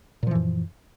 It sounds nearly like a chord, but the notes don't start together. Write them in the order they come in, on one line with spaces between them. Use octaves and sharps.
A#2 F3 E3 F#2